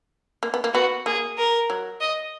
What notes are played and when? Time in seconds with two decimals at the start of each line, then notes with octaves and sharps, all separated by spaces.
0.43 A#3
0.54 B3
0.64 A#3
0.74 B3 F#4
1.06 A#3 G#4
1.38 A#4
1.70 F#3
2.01 D#5